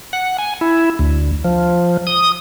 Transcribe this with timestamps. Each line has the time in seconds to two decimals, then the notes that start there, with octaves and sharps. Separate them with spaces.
0.13 F#5
0.38 G#5
0.61 E4
0.99 D2
1.44 F3
2.07 D#6